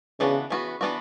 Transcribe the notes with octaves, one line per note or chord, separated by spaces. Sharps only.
C#3 E3 B3 D4 F#4
E3 B3 D4 F#4
E3 B3 D4 F#4